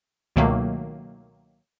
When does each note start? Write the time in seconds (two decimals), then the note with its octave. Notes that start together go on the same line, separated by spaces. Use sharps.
0.36 C#2 B2 D#3 F#3 A3 A#3